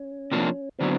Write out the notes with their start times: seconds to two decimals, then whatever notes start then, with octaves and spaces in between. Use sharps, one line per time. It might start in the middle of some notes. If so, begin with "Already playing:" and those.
Already playing: C#4
0.32 C3 F3 A#3 D4
0.79 D3 F#3 B3 C4 D4